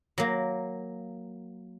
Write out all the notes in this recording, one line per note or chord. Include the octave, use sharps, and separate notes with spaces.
F#3 A#3